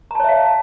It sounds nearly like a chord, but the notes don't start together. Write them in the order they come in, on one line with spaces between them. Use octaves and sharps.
A#5 A5 C#5 E5 F5